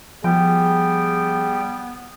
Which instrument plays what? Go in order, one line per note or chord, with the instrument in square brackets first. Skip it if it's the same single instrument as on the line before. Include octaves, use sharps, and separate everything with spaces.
[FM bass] F3 [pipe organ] G3 G5 [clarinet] B3 [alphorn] G#4